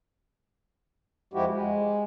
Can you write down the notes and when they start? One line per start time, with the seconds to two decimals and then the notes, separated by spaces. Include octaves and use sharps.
1.33 F2 F3 G#3 E4 F#4 G4
1.49 G#3